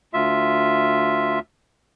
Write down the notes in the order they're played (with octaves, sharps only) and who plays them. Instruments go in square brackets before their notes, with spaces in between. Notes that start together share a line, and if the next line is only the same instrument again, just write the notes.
[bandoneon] D2 F4 E5